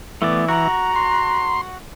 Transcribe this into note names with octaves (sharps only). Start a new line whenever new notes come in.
E3 A3 B3 D5
F#4 F#5 A#5
C6